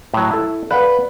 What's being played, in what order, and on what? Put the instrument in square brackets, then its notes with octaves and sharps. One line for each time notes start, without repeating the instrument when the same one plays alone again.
[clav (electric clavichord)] A2 F#3
E4 A4
[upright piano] B4 [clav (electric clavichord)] D5 F5 F#5